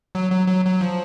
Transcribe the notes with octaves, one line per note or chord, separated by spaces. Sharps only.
F#3
F#3
F#3
F#3
F3